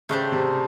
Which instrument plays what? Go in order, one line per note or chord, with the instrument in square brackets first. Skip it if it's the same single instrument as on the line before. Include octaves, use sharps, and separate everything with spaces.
[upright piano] C#3 [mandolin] A3 D4 G4 C5
[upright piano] C3